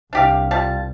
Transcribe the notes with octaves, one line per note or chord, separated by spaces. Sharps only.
C2 D4 G4 F5
G3 F4 A5